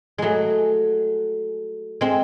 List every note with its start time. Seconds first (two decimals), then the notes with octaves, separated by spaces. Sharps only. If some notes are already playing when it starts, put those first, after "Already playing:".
0.18 F#3 G#3 A3
2.01 G#3 C4